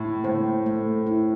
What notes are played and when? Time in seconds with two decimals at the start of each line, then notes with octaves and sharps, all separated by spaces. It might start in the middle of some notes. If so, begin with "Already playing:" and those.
Already playing: A2 E4
0.24 A2 C5
0.66 A3
1.07 E4